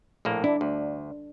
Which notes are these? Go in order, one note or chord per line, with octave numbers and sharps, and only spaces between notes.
A#1 A2 A#3
D4 E4
D2